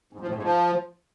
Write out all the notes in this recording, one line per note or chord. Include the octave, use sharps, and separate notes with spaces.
G#2
F3
A2
G#2
F3